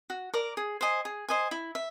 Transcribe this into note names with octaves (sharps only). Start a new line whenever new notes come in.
F#4
A#4 D5
G#4
C5 D#5 G#5
G#4
C5 D#5 G#5
E4
E5